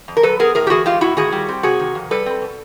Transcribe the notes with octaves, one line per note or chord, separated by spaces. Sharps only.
F2
A#4
F#3 A4 B4
B3 G#4 A#4
A2 G#4 A#4
G4
E3 F#4 G#4
G#3 F4 G4
A2 E4 F#4
D#3 F#4 G#4
G3
C4
C3 F#4 G#4
D#3
F2
G3 A4 B4
C4
B2